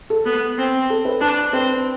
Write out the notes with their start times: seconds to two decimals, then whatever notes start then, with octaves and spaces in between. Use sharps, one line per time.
0.10 A4
0.25 B3
0.58 C4
0.90 A4
1.05 B4
1.21 D4
1.53 C4 B4